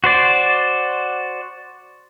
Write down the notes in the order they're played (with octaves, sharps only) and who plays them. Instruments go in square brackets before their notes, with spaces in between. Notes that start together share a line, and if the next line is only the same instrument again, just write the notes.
[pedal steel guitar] F#4 C5 D5